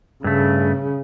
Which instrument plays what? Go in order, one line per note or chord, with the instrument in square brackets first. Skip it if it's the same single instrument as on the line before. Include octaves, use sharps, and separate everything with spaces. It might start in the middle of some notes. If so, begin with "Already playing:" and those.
[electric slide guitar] G2 A3 [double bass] C#3